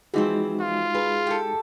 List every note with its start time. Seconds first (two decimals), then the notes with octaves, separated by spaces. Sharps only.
0.14 E3 F3 G#3 C4 D#4 F#4 G#4
0.61 F4
0.95 G#4 B4
1.27 G4 A4